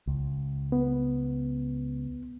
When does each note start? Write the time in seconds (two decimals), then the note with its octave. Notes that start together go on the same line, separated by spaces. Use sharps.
0.07 C#2
0.72 B3